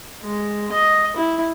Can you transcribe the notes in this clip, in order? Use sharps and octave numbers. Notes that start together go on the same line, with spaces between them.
G#3
D#5
E4